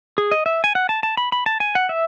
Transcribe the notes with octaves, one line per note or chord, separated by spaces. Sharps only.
G#4
D#5
E5
G#5
F#5
A5
A5
B5
B5
A5
G#5
F#5
E5